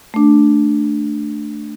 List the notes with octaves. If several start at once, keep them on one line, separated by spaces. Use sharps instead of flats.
A3 D4